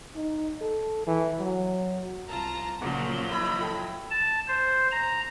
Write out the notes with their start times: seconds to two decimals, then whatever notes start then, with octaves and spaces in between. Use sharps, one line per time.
0.16 D#4
0.61 A4
1.07 E3
1.40 F#3
2.28 C2 F4 A5 A#5
2.81 A#2 C#3 F3 F#3 F#5 D6
3.31 D#4 E4 B4 B5
3.61 A4 G5
4.11 A5
4.48 C5
4.92 A#5